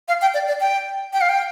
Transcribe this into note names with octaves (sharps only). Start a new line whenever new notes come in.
F5
G5
D5
D5
G5
G5
F5
G5